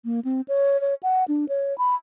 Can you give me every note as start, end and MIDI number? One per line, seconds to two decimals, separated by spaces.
0.05 0.20 58
0.25 0.41 60
0.48 0.80 73
0.81 0.94 73
1.03 1.24 78
1.28 1.45 62
1.49 1.76 73
1.78 1.95 83